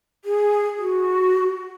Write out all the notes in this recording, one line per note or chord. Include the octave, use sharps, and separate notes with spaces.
G#4
F#4